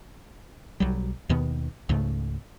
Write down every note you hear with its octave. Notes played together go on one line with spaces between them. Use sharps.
B1 F#3 G3
D#2 B2 D#3 B3
C#2 G#2 C#3 A3